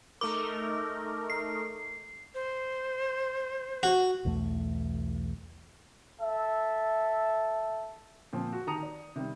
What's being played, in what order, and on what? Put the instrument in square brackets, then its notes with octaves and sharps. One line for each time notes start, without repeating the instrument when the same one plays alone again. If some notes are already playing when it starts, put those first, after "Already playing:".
[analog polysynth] A3 D#4 A#4 [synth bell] D6
[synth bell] C7
[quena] C5
[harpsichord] F#4
[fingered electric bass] B1 E2 E3 A3
[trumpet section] A4 E5
[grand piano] A#2 F3 C4
F#4
D#3 A5 A#5 D#6 C#7 F7
D5
C3 D#3 G3